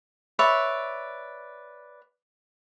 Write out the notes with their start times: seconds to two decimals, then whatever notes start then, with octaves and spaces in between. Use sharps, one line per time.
0.39 B4 C#5 D5 E5